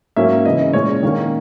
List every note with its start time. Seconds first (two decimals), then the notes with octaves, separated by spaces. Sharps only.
0.16 G#2 F#3 A#3 C#4 E5
0.45 C#3 E3 B3 D#5
0.73 A#2 G#3 C#4 C#5
1.03 D#3 A#3 C#4